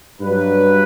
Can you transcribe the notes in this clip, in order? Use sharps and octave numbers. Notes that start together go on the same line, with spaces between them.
G2 F#3 B4